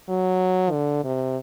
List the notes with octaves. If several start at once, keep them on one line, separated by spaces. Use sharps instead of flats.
F#3
D3
C3